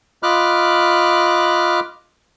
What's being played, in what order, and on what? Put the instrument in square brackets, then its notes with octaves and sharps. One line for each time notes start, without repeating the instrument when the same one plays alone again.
[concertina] F4 D#5 B5 D6 F6 F#6